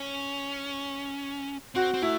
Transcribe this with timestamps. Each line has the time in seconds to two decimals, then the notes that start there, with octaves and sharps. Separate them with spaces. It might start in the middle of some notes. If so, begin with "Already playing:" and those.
Already playing: C#4
1.75 C4 F#4
1.94 C4
2.02 A3 E4